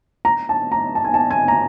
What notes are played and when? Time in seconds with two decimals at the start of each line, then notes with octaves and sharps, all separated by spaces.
0.25 A#5
0.49 A5
0.72 A#5
0.95 A5
1.05 G#5
1.14 A5
1.31 G#5
1.48 A#5